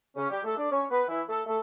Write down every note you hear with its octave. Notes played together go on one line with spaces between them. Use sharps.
C#3 C#4
G3 G4
A3 A4
D4 D5
C#4 C#5
B3 B4
E3 E4
A3 A4
A3 A4